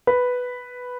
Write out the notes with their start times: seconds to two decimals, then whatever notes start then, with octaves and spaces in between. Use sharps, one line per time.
0.07 B4